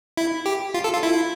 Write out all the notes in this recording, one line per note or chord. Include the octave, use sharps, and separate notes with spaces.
E4
G4
F4
A4
F4
E4